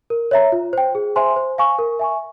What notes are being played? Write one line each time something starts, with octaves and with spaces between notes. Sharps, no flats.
A#4
C#5 E5 A#5
F4
C5 G5
G#4
C5 E5 G#5 C6
C5
F5 G#5 C#6
A#4
E5 G#5 C#6